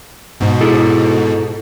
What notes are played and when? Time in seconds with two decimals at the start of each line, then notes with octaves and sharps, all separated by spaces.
0.40 G#2 B2
0.61 E4 G#4 A4